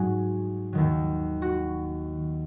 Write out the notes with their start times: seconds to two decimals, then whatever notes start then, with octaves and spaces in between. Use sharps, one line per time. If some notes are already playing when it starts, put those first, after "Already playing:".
Already playing: G#2 F#3 F#4 G#4
0.73 D#2 D#3 F#3
1.42 F#4